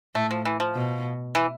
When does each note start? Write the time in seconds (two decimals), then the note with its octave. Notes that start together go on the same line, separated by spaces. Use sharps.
0.15 A2 A3
0.31 F3
0.45 E3
0.60 F3
0.75 B2
1.35 E3